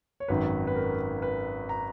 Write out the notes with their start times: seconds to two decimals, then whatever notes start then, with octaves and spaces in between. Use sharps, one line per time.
0.20 C#5
0.28 G#1 F#2 D#3 F#3 B4
0.67 B4
0.76 A#4
1.22 B4
1.69 A#5